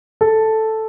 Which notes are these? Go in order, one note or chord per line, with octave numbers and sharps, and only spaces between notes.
A4